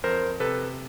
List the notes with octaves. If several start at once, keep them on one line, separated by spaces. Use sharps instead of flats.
F2 A#4 C5
C3 A4 B4